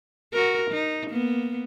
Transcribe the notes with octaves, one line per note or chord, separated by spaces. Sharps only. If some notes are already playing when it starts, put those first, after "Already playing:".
F#4 A#4
D#4
A#3 B3